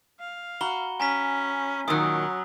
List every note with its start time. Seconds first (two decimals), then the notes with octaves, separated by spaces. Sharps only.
0.20 F5
0.61 F#4 A#5 B5 G7
1.00 C#4 G#5 A#5 B6
1.88 A#2 D#3 F#3 D#6 E6 F#6